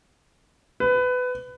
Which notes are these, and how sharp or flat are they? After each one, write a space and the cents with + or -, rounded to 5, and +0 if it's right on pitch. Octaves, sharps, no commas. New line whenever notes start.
B4 +20